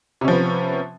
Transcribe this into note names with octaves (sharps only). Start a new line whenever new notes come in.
C3 F3 B3 C#4